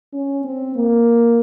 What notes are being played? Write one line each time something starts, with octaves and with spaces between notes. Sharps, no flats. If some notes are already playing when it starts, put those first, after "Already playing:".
C#4
C4
A#3